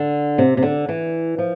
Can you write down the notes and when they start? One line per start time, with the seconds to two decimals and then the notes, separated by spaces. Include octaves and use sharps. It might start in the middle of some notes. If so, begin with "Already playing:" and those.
Already playing: D3
0.38 C3
0.57 C3
0.62 D3
0.89 E3
1.38 F3